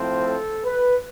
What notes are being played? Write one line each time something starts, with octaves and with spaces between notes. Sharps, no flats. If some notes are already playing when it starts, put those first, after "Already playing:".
Already playing: A2 F3 C4
A4
B4